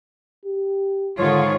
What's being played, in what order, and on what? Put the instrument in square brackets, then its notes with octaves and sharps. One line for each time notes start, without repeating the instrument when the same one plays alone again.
[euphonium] G4
[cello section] G#2 D#3 F4 [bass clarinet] D3 [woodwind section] C#5